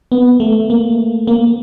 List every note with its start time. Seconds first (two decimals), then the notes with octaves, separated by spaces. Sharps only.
0.12 B3
0.40 A3
0.70 A#3
1.27 A#3